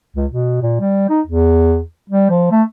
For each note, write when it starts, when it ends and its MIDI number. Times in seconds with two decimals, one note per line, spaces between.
0.16 0.26 37
0.32 0.60 47
0.62 0.79 46
0.80 1.09 55
1.10 1.21 63
1.27 1.80 40
2.10 2.29 55
2.30 2.48 53
2.51 2.63 57